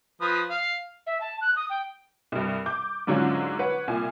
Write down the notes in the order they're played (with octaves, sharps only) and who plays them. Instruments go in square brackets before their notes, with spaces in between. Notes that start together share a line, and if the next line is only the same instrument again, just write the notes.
[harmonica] F3 B4 D#6
F5
[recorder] E5
A5
F#6
D#6
G5
[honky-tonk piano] C2 G2
D6 G6
G#2 D3 F#3 C#4 D4 F4
B4 C#5 F#5
C2 A#2 G#5